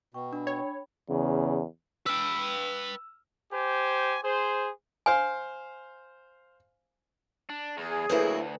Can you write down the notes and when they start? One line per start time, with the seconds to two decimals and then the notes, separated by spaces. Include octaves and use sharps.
0.14 B2 G5 C#6
0.33 D4 G5 B5
0.47 C#5
1.10 E2 C#3
2.06 B4 G5 E6 F6
3.52 G4 C5 G#5
4.23 G#4 C5
5.06 C5 F5 G#5 C6
7.49 D4
7.77 E2 G#4
8.10 D2 F#3 A#3 E4 A4 B4 C5